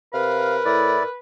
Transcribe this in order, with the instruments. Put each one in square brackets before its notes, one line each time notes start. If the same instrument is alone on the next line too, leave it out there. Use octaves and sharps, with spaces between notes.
[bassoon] C3 [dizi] A#4 [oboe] B4 [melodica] F5
[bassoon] A2 [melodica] E4 D5